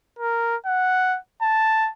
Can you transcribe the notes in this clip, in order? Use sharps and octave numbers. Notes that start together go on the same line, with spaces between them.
A#4
F#5
A5